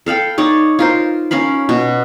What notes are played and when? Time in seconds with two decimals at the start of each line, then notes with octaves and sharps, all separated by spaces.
0.06 A4 F5 G5 B5
0.38 D#4 C#5 D5
0.79 F4 A#4 C5
1.31 C#4 A#4 F5 B5
1.69 B2